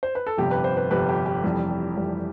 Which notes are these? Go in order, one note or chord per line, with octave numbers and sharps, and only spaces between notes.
C5
B4
A4
G1 F2 C3 G3 G4
B4
C5
B4
G1 F2 C3 G3 B4
G4
G4
F1 F2 E3 G3
F1 F2 E3 G3